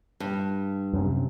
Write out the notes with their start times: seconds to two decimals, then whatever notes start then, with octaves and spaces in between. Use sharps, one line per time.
0.20 G2
0.93 F#2 C3